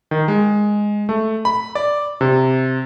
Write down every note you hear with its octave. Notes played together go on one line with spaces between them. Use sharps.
D#3
G#3
A3
B5
D5
C3